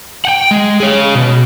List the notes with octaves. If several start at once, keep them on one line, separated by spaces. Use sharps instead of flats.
F#5 G5
G#3
G#4 C#5
B2